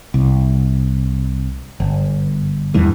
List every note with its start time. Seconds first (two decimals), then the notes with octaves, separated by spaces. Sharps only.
0.14 C2
1.80 G1
2.74 E2 G2 E3